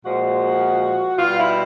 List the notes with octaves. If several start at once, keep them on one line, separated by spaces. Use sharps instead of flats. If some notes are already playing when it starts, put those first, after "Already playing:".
A#2 F3 G#3 F#4
B2 G3 F4
E4